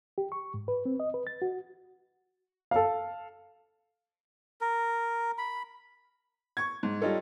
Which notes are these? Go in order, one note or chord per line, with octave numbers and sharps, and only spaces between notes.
G4
C#6
G#2
B4
C4
D#5
B4
A6
F#4
A4 F5
A#4
B5
C#6 G#6
G#2
G3 D#4 F4 A4 C#5